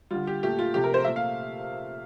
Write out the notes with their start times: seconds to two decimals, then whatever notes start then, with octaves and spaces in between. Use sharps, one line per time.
0.11 D3 G3 F4
0.27 G4
0.43 A#2 A3 G4
0.59 F4
0.74 C3 F3 A3 G4
0.84 A#4
0.94 C5
1.04 A#2 A3 E5
1.16 F5